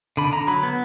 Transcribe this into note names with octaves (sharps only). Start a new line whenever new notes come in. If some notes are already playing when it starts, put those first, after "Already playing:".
D3 B5
D3 A#5
F#3 B5
B3